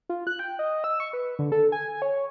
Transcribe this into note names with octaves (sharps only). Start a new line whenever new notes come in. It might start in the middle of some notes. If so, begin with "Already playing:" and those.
F4
F#6
G5
D#5
E6
C#6
B4
D3
A4
G#5
C#5